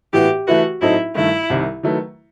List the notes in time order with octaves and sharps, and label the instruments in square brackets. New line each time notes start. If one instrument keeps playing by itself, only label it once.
[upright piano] A2 E3 B3 F#4 [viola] G4
[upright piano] E3 A3 E4 B4 [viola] F#4
[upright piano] A2 F#3 C4 D#4 A4 [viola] E4
[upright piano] G2 D#3 A3 [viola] E4
[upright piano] C2 C3 D#3
D#3 F#3 A3 E4 B4